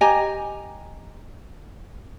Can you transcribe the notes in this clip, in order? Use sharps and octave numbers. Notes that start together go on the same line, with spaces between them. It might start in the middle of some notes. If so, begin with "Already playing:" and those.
G4 D#5 G#5 A#5